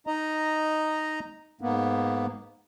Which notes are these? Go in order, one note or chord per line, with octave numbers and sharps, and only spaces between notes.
D#4 D#5 A#5
G#2 A#3 B3